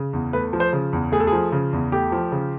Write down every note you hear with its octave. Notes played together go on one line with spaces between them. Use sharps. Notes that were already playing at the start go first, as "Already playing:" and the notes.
Already playing: C#3
E2
A3 B4
F3
C5
C#3
E2
A3 G#4
A4
G#4
F3
C#3
E2
A3 G4
F3
C#3